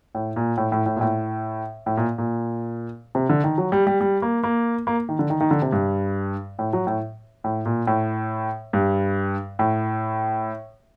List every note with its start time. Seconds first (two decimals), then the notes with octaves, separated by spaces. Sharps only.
0.15 A2
0.36 A#2
0.57 A2
0.72 A2
0.86 A2
0.96 A#2
1.01 A2
1.86 A2
1.97 A#2
2.18 A#2
3.15 C3
3.29 D3
3.44 D#3
3.58 F#3
3.72 G3
3.87 G3
4.01 G3
4.22 A#3
4.43 A#3
4.87 A#3
5.09 D#3
5.19 D3
5.30 D#3
5.40 D#3
5.51 D3
5.62 C3
5.72 G2
6.59 A2
6.73 F#3
6.87 A2
7.44 A2
7.66 A#2
7.87 A2
8.73 G2
9.59 A2